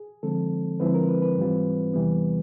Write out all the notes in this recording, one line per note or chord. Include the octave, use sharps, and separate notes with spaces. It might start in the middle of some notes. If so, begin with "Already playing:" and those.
Already playing: G#4
D3 F3 G#3 C4 A4
D3 F3 G#3 C4 E4 B4
A#4
B4
B4
G#2 E3 G3 C4 F4
E2 C3 E3 G3 B3